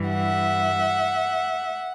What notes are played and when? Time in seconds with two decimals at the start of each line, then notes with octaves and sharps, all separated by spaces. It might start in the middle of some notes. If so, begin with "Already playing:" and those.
Already playing: G2 E3 G3
0.09 E5 F#5